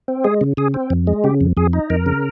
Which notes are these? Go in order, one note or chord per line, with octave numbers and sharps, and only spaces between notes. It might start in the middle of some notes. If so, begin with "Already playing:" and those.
C4
G#3 G#4
C#3
C#3 G#4
C4
F2
G#3
C#3 G4
F2
F2 G#4
D#4
F2 A#4
C#3